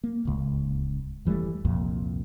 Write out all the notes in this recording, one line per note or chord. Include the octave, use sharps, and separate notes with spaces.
A#3
D1 C#2
F1 E3 G3 A3
C2 F2 A#2